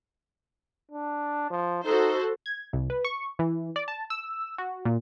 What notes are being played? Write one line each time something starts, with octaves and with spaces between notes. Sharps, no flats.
D4
F3
D#4 F#4 A4 C5
G#6
C2
B4
C#6
E3
D5
A5
E6
F#4
A#2